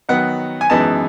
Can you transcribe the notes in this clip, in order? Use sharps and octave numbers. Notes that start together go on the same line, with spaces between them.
D#3 F#3 B3 D#4 F#5
G#5
F#2 E3 G#3 B3 D#4 A5